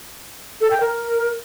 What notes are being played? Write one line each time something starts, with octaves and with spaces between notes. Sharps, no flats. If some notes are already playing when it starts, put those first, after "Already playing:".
A4
G5
A#4